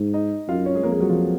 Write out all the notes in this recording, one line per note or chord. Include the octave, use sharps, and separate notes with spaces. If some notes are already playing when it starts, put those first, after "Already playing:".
Already playing: G#2
D#4 D#5
F#2 F4 F5
C#4 C#5
G#3 G#4
F2 A#3 A#4
G#3 G#4
F#3 F#4
F3 F4